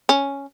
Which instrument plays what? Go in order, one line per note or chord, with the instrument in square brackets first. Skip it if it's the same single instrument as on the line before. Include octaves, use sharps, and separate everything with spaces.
[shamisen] C#4